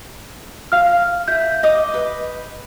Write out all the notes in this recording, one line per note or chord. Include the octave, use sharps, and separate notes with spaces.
F5 F6
E4 G6
D#5 D6 D#6
B4